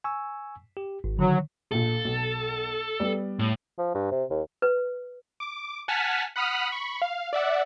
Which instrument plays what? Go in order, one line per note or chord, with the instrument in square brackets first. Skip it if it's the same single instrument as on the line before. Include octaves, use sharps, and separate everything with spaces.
[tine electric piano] G#5 C#6 E6
G4
G#1
[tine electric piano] D3 D#3 [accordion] F#3
[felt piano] A#1 A#2 [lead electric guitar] A4
[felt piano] B1
G3 B3 D5
[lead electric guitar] A2
[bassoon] F3
G2
C3
D#2
[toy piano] B4
[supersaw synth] D6
F#5 G#5 A5 F6 B6
F#5 B5 D#6 F6 F#6 B6
B5 C#6
F5
D5 E5 F#5